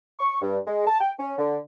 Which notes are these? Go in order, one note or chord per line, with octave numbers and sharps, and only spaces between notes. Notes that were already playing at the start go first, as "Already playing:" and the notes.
C#6
G2
G#3
A5
G5
C#4
D3